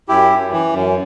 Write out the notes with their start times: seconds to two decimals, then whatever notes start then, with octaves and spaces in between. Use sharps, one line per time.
0.09 F#2 E4 G4
0.30 F#2
0.52 E3
0.73 F#2